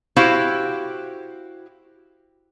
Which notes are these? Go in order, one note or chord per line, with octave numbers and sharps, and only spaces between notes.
E4 F#4 G4 C5 F5